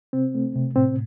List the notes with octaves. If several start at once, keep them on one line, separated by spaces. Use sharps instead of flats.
C3 C4
A3
C3
A2 C4